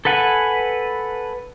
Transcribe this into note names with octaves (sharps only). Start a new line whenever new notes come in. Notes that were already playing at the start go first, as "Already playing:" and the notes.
A4 B4 F#5 G#5